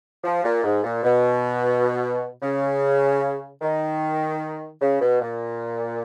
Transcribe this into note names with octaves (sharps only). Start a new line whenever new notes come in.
F3
A#2
G#2
A#2
B2
C#3
D#3
C#3
B2
A#2